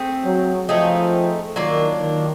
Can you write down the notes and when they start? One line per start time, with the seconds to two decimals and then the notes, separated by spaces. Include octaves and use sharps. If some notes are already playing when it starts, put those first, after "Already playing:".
Already playing: A3 C4 G#4
0.24 F#3
0.69 F3 A3 C4 D#4 G#4
1.55 D#3 F#3 A#3 D4 F4
2.00 D#3